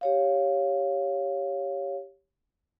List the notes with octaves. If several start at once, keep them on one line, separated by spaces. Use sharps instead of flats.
G4 C#5 F5